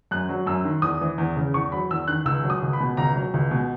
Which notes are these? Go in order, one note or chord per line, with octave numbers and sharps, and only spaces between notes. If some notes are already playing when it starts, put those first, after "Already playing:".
F#2 F#6
F#3
F#2 E6
D#3
E2 D#6
E3
E2
C#3
E2 C#6
F#3 B5
E2 E6
D#3 F#6
C#2 E6
F#3
D#6
C#2
B5
B2
C#2 A#5
F#3
C#2
B2